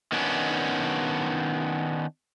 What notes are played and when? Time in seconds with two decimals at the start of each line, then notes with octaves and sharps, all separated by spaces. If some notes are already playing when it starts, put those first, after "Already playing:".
0.12 D#3 B3 C#4 D4